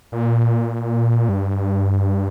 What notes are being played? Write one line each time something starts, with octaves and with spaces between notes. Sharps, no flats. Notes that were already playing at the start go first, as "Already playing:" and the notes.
A#2
G2